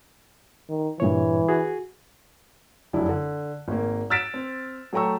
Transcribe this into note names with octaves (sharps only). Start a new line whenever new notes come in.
D#3
G2 A#2 E3 C#5
F#4 G#4
F1 F#2 D4 E4
D3
G#1 A#3
E6 F6 A6 B6 D7 E7
C4
F#3 A3 G5 A#5 C#6 E6